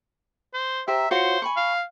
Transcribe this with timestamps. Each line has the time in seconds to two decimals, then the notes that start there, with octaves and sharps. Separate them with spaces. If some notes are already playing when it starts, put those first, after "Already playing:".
0.54 C5
0.88 G4 C5 E5 A#5
1.11 F4 F#4 C5 C#5
1.42 G#5 B5 C#6
1.57 F5